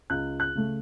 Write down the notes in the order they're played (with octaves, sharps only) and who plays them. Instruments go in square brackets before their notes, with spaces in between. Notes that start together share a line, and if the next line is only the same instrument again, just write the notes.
[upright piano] C#2 F#6
F#6
C#3 A3